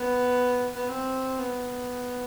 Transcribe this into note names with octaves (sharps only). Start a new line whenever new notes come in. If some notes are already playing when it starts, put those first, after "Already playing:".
Already playing: B3
B3
C4
B3